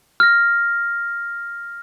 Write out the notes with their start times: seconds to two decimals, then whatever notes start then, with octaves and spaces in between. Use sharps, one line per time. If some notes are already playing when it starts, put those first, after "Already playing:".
0.20 F6 A#6